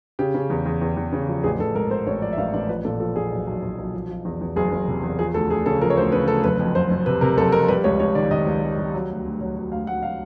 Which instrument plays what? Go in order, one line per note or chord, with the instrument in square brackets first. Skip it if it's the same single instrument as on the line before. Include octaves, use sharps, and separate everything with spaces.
[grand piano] C#3 G4
C#3
E2
E2
E2
E2
C#3
F3
A1 G#4
A1 A4
G#2 A#4
G#2 C5
A1 C#5
F3 D5
E5
A1 F5
A1 D5
F3 B4
A#2 A4
F3 A4
A#2 G#4
B1
B1
B1
B1
F3
F3
E2
E2
F#1 G#4
F#1
C3
E2
F3 G#4
D2 A4
D2 G#4
C#3 A4
F3 A#4
C#5
D2 C5
C#3 B4
D2 A4
F#1 B4
F2
F#1 C5
F#1
C3 B4
C3 A#4
F#1 A4
F2 A#4
G3 B4
C#2 C#5
C#2 C#5
D#3 D5
D#3 D#5
C#2
G3
G3
F#3
D2
D2
F#3
F#3
D2 F5
D2 F#5
F#3 F5